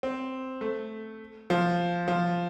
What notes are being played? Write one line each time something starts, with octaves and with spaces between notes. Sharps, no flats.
C4
A3
F3
F3